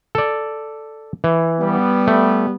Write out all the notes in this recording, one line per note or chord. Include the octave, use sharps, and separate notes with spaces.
A4 D5
E3
G3 B3
A3